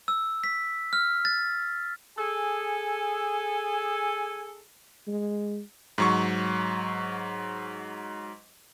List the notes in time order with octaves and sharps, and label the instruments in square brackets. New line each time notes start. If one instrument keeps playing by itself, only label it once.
[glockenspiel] E6
B6
F6
A6
[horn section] G#4 A4 G#5
[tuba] G#3
[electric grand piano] G#2 F#3 C#6